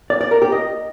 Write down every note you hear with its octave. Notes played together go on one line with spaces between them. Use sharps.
D5
D5
A#4
G4
D#5